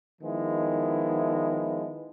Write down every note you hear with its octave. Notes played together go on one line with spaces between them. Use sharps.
D#3 F3 G#3 B3 E4